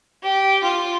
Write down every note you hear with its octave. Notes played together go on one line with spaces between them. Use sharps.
G4
F4